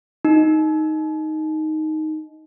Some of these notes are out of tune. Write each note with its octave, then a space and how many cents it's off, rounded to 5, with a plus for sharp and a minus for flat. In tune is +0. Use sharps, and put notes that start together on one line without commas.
D#4 +5